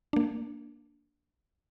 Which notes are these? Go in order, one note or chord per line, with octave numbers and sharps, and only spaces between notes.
A#3 D4